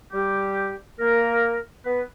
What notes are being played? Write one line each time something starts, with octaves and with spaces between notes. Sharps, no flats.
G3 G4
A#3 A#4
B3 B4